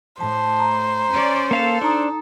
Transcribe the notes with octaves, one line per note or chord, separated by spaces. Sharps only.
A2 C5 A5
A#5
C#4 D5
A#3 A4 F5 A5
D4 D#4 A#5 D#6